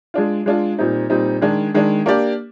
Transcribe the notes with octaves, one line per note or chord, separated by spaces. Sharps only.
G#3 D4 F4
G#3 D4 F4
A#2 G3 C4 D#4
A#2 G3 C4 D#4
D#3 G#3 D4
D#3 G#3 D4
A#3 D4 G4 D5